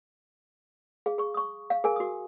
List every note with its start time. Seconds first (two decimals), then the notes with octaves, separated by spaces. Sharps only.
1.06 G#4 F5
1.18 G#4 C#6
1.34 C#6 D#6
1.70 F5
1.84 G#4 A#4 G#5
1.96 F#4 D#6